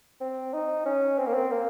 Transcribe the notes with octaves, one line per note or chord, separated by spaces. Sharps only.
C4
D#4
C#4
C4
A#3
C4
A#3